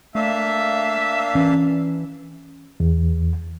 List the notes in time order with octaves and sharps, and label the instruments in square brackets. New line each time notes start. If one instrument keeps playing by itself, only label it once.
[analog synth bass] A3 [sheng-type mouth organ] A#3 D4 F5 [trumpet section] E5
[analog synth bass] E3 [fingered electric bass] C#4
[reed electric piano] E2